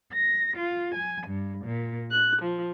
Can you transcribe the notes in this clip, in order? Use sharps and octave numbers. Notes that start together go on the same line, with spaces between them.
A#6
F4
G#5
G2
A#2
F#6
F3